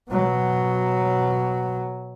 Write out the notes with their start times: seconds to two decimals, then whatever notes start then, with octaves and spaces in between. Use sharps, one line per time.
0.10 B2 F#3